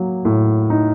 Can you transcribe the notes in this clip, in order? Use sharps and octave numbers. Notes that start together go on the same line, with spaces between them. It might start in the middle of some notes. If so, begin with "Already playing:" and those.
Already playing: F#3 A#3
A2
D#4